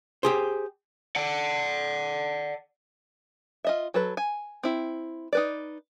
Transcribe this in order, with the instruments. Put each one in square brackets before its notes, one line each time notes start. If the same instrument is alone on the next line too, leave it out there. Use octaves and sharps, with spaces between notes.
[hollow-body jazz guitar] G4 G#4 C5
[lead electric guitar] D5 F#5
[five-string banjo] F4 D#5 E5
F#3 A4 B4
G#5
C4 E4
D#4 B4 D5